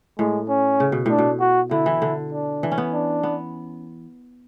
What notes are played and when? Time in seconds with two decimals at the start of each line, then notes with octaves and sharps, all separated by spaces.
0.19 A2 G#3
0.49 C#4
0.80 C#3
0.92 B2
1.06 A2 D4
1.18 B2
1.40 F#4
1.71 D3 E4
1.86 E3
2.02 D3
2.33 D4
2.63 E3
2.72 C#4
2.78 B3
2.94 D4
3.23 B3